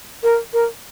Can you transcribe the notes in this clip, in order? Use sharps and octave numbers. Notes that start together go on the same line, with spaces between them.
A#4
A#4